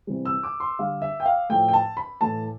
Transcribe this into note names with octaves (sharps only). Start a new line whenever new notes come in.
C3 E3 G3
E6
D6
C6
D3 G3 F5
E5
G5
F5
A2 F3 A3 G5
G5
A5
B5
A2 E3 A3 A5